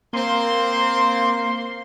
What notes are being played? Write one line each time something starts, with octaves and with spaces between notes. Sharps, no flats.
A#3 C4 C5 C6